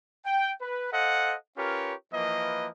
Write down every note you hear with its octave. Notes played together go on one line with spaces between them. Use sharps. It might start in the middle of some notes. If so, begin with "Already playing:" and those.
G5
B4
A4 C5 D#5 F5 F#5
C#4 F4 G4 A#4 B4 C#5
E3 F3 A#3 A#4 B4 D#5